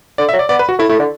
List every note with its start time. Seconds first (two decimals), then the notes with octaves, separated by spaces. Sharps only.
0.18 D3 D5
0.29 E5
0.33 F#3
0.39 D5
0.49 B3 D5
0.59 B4
0.69 F#4
0.79 A3 E4
0.89 A3 E4
0.99 D3